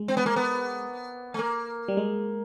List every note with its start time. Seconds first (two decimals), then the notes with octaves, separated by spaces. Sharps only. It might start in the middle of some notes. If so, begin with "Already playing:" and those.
Already playing: G#3
0.08 C4
0.17 B3
0.26 A#3
0.36 B3
1.34 A3
1.39 A#3
1.88 G3
1.97 G#3